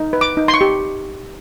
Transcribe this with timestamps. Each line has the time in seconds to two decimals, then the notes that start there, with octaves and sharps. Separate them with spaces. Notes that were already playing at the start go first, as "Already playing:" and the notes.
Already playing: D#4
0.13 B4
0.21 D6
0.37 D#4
0.48 C6
0.54 C#6
0.61 G4